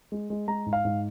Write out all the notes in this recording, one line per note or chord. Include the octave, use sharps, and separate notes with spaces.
G#3
G#3
G#3 A#5
G#2
F5
G#2